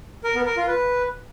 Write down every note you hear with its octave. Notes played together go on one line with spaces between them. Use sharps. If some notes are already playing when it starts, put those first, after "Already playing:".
A#4
B3
A#4
F4
B4